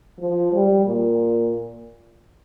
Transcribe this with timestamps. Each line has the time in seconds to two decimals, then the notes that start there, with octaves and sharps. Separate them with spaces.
0.19 F3
0.53 G3
0.86 A#2